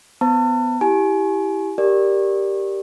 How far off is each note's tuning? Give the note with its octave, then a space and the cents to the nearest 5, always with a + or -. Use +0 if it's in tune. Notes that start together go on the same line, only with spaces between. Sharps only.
B3 +20 C5 +10 A5 +40
E4 +0 G4 +0 G#5 +30
G4 +0 A#4 +0 D5 +0